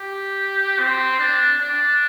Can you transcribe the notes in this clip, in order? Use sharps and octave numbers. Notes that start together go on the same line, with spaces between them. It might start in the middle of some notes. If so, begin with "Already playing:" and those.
Already playing: G4
C4
D4
D4